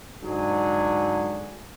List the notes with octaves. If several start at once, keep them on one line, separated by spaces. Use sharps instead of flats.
G#2 D3 F#3 G#4